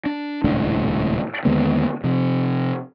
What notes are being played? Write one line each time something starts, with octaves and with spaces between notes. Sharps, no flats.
D4
D#1 C#2 A2 D4
D#2 D3 G#3 B3
C3 F3